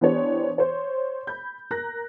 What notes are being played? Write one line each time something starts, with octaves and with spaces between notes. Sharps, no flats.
E3 B3 D4 G4 C5 C#5
C5 C#5
B5 G6
A#4 A#5 F#6 A#6